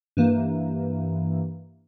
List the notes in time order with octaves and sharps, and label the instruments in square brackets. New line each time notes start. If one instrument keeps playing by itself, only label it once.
[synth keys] G2 E3 A#3